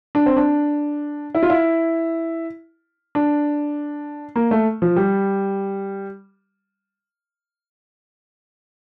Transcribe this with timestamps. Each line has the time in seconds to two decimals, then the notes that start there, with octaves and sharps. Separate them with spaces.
0.15 D4
0.26 C4
0.37 D4
1.35 E4
1.43 F4
1.50 E4
3.15 D4
4.36 A#3
4.51 A3
4.82 F3
4.96 G3